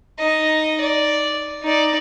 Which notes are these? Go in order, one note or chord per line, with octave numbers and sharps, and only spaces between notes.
D#4 D#5
D5
D#4 D5